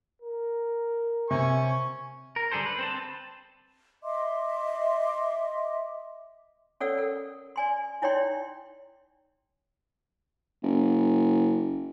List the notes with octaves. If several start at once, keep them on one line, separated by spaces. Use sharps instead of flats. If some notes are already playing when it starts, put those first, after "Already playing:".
A#4
C3 G#5 C#6
A#4
D3 G3 G#4 A4 C5
B4
C4 C5 A5
D#5 E5 C6 D6
C#4 A4 C#5 D5 F#5 E6
A4 A#4
D5 G#5 C6
D#4 E4 C#5 D5 G5 C6
F#1